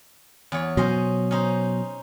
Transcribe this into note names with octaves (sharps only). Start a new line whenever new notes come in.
E2 C#5
B2 F#3 C#4 C5 D#5
C#4 D#4 C5